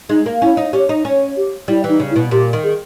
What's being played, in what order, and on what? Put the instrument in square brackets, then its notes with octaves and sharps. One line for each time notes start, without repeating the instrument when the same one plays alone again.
[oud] G#3 [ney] D#4
[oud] A#3
[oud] C#4 [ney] E4
[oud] D#4
[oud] C#4 [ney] G4
[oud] D#4
C#4
[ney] G4
[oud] G3 [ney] E4
[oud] E3
[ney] D#4
[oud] C#3
[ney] E4
[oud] B2
[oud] A#2 [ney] G4
[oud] D#3
[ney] G#4